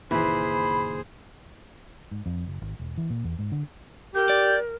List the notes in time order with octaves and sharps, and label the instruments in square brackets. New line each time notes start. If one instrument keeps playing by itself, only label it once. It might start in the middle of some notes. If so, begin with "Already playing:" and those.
[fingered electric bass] F#1 A#2 D#3 [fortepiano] E3 [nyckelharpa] G#4 C5 [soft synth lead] B5
[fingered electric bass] G#2
F2
F#1
G#1
E1
E3
A#2
E2
G#2
D3
[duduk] G4 [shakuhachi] A#4 [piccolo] G6
[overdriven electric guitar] D5